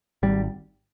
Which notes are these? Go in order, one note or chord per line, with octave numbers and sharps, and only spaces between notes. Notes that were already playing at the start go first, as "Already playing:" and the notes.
G#1 G3